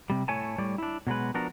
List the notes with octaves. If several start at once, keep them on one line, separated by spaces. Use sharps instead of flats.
C3 G3
A2 A3 C#5 G#5 A5
A2 G3 C#5 D5
D4 E4
B2 F#3 G#3 B4
F3 B3 D4 F#4 A#4